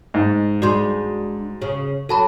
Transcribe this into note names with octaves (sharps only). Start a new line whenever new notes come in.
G#2
G#3 D4 F#4 C6
C#3
F#3 A4 A5 B5